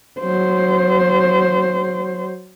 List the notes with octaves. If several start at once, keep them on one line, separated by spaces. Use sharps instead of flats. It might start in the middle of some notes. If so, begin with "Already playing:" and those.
F#3 C5